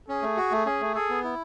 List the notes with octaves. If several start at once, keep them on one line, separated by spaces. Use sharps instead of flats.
C#4 G#4
A3
F#4
A3
C#4 G#4
A3
G#4 A4
B3
E4